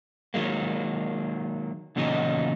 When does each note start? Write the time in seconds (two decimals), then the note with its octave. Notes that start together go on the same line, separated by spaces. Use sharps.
0.34 D#3 F#3 G#3 A#3
1.96 E2 A#2 C#3 F#3 D#4 D#5